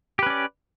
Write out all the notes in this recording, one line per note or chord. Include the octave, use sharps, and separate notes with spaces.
C#4 G4 B4 D5